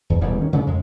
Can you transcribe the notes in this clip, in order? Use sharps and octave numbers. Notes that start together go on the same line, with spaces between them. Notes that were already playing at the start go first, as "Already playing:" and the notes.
E2
E1 A1 E2 G3
D#3 C#4
C#3 A3
F2 G#3